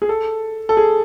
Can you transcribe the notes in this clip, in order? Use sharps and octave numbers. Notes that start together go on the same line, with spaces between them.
G#4
A4
A4
G#4